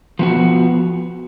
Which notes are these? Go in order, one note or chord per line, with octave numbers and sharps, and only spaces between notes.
F3 B3 F#4